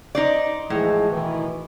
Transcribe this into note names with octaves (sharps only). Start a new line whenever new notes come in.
D#4 C5 D5
A2 E3 F3 G#3
B2 D#3 E3